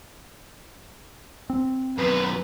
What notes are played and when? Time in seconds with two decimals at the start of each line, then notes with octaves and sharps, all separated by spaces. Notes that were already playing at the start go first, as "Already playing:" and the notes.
1.50 C4
1.98 F#2 B2 B4